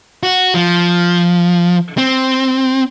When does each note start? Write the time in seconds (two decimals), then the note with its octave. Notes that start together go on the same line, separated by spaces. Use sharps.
0.23 F#4
0.55 F3
1.98 C4